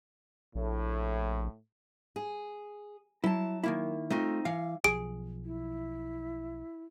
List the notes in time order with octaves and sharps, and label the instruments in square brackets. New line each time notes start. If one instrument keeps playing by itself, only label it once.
[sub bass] A#1 [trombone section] A2
[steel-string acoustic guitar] G#4
[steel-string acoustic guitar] F#3 A5 [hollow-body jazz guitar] E4
[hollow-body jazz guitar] D#3 A#3 E4
[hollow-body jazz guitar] A3 F4 [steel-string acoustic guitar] C4 D#4
[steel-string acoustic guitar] E3 [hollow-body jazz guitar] F5
[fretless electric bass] B1 F3 [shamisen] G#4 [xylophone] D7
[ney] E4